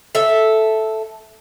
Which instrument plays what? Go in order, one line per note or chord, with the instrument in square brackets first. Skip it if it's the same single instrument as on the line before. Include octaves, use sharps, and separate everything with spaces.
[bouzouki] A4 E5